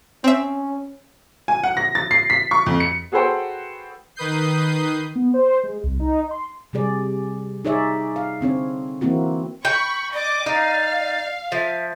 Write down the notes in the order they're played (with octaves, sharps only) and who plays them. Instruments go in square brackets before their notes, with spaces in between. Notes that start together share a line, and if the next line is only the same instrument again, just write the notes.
[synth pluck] C4 E5 [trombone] C#4
[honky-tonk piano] G#5
F#5
A#6
A6
C7
B6
C#6
F2
C#7
[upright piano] F#4 G#4 A4 B4 C5 G5
[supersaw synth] D#3 B4 D#6 G6 C7
[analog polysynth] B3
C5
G#3
C2
D#4
C6
[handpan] C3 G3 G#4 D5
D#4 G#4 C#5 D5 E5
F5
D3 C4 D4 C#5
E3 A#3 C4 E4 F#4
[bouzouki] G5 [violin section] B5 C#6
[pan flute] D5 [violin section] D#5 D6
[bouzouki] D#4 [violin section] F5
[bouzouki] F3 [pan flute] E5